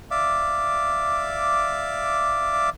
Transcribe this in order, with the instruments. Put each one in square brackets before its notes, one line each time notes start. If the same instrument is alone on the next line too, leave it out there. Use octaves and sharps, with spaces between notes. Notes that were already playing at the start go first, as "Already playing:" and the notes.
[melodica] D5 E5 F5 D6